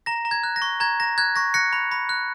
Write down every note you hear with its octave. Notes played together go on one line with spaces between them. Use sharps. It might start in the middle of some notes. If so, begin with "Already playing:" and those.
A#5 A#6
A#5
G#6
F#6
A#6
C#6
A#5 G#6
A#5 A#6
F#6 G#6
C#6 A#6
F#6 A#6 C#7
B5
B5
F#6